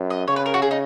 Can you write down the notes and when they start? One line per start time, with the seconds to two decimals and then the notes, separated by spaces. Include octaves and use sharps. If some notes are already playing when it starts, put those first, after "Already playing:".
Already playing: F#2
0.10 D#5
0.28 C#3 C#5
0.36 B4
0.46 A#4
0.54 F#4
0.62 G#4
0.71 D#4